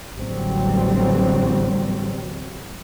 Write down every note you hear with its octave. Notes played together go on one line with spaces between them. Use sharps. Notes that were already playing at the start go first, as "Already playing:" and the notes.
A1 E2 D3 F#3 G3 C4